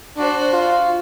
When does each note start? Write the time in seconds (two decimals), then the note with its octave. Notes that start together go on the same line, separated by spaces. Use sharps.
0.17 D4 F#4 C5
0.53 F4